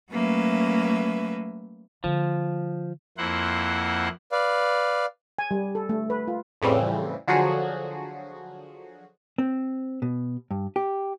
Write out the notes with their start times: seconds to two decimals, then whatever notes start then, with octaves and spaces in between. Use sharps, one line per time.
0.11 F#3 A3 A#3 C#4 B4 E5
2.04 D3 F3 A#3
3.18 F2 A#3 E4 C5 F#5
4.32 B4 D5 F5
5.39 G#5
5.51 G3
5.75 A4
5.89 A3
6.10 B4
6.28 F4
6.62 F2 A2 C#3 E3 G3 C4
7.28 D3 F3 F#3 F#4 G#4
9.38 C4
10.02 B2
10.51 G2
10.76 G4